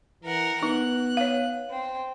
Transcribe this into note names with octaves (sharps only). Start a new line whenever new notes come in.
E3 A#4 F#5
B3 D#4 F#6
C#5 F5
C4